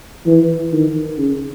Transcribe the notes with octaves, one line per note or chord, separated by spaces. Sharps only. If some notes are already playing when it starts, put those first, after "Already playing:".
E3
D#3
C#3